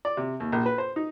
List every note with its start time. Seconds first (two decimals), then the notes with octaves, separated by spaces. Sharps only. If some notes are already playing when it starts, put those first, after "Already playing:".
0.05 D5
0.17 C3
0.40 D#2
0.52 A#1
0.66 B4
0.78 C5
0.96 D#4